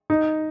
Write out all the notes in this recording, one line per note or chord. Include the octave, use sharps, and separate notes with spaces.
D#4